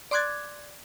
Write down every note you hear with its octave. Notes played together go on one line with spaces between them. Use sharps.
D5 C6 D6 F#6 G#6 A6